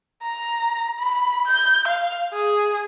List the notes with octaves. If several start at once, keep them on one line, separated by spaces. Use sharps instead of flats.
A#5
B5
G6
F5
G#4